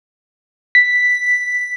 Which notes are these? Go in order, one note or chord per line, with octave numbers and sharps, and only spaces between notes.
B6